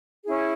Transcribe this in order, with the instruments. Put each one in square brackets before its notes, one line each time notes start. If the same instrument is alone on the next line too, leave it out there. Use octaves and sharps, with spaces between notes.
[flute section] C#4 E4 G#4